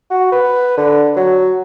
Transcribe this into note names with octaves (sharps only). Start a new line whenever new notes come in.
F#4
B4
D3
F#3